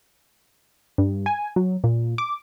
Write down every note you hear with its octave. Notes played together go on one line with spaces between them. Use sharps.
G2
G#5
F#3
A#2
D6